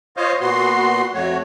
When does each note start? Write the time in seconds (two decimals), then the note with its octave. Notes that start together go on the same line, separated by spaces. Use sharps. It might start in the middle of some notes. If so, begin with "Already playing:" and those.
0.17 F4 C5 C#5 D#5 F5
0.41 A#2 B3 F#4 C6
1.14 F2 A3 F#4 C#5